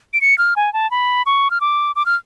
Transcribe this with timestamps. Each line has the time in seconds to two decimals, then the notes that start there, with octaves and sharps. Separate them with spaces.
0.13 D7
0.21 C#7
0.38 F6
0.56 G#5
0.74 A5
0.91 B5
1.26 C#6
1.51 F6
1.61 D6
1.96 D6
2.06 F6